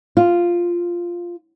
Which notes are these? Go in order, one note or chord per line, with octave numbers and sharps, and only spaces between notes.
F4